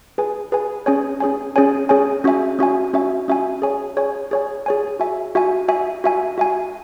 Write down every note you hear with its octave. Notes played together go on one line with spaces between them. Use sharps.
G#4 B4 G#5
G#4 B4 G#5
C#4 G#4 C#5 G#5
C#4 G#4 C#5 G#5
C#4 G#4 C#5 G#5
C#4 G#4 C#5 G#5
C#4 F#4 E5 G#5
C#4 F#4 E5 G#5
C#4 F#4 E5 G#5
C#4 F#4 E5 G#5
G#4 C#5 G#5
G#4 C#5 G#5
G#4 C#5 G#5
G#4 C#5 G#5
F#4 E5 G#5
F#4 E5 G#5
F#4 E5 G#5
F#4 E5 G#5
F#4 E5 G#5